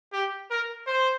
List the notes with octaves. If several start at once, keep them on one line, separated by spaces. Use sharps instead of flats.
G4
A#4
C5